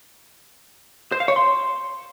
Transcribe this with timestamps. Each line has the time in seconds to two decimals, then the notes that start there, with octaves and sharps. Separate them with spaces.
1.12 C5
1.20 F5
1.28 C#5
1.36 C6